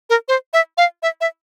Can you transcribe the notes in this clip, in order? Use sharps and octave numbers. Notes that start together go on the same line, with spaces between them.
A#4
C5
E5
F5
E5
E5